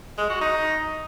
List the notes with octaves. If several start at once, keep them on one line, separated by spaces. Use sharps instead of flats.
G#3
F#4
D#4